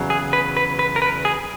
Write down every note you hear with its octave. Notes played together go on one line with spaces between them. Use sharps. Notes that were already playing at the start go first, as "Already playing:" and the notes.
Already playing: E2 C#3 F#3
G#4
B4
B4
B4
A#4
B4
G#4